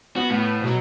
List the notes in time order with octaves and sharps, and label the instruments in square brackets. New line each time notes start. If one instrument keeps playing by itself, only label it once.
[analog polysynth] B3 [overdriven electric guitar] F#4
[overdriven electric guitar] A2
[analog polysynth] B2 F#3